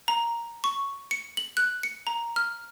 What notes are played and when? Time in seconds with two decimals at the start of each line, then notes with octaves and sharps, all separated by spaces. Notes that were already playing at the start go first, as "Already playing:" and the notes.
0.08 A#5
0.64 C#6
1.11 C#7
1.37 F#7
1.57 F#6
1.83 C#7
2.07 A#5
2.36 F6